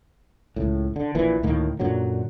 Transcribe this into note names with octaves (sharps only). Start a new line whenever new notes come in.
C#2 A2
D3
A#1 A#2 E3
D2 A2 D#3 A#3
F#2 A#2 D3 F#3